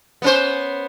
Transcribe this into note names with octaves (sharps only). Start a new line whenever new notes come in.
B3 C#4 C5